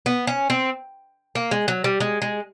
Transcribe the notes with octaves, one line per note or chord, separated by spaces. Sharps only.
B3
C#4
C4
A#3
G#3
F#3
G3
G#3
G#3